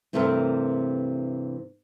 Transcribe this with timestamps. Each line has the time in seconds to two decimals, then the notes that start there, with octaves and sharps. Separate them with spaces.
0.13 G2 C3 E3 A3 C4 A#4